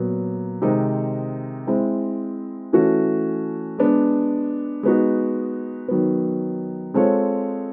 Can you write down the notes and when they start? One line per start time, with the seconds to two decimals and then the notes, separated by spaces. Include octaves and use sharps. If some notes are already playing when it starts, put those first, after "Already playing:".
Already playing: A#2 F#3 B3
0.62 C3 D#3 G#3 C4 D#4
1.67 G#3 C4 E4
2.73 E3 A3 C#4 F#4
3.78 G#3 B3 D4
4.83 G#3 B3 D#4 F#4
5.88 D#3 F#3 B3
6.94 G#3 C4 F4 A4 C#5